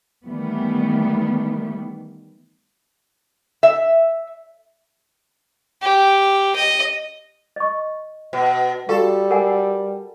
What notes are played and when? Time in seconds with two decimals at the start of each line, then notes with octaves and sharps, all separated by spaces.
0.25 D#3 E3 G3 A3 B3
3.63 E5
5.82 G4
6.56 D#5
7.56 D#5 C#6
8.33 B2
8.89 G3 F#4 G4 A4 F5
9.31 A#4 F#5 G#5